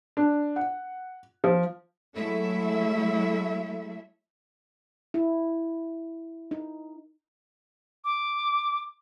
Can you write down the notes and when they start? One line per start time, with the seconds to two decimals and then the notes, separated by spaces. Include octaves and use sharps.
0.17 D4
0.56 F#5
1.44 F3
2.14 F#3 G#3 A3 E4 A4 E5
5.14 E4
6.51 D#4
8.05 D6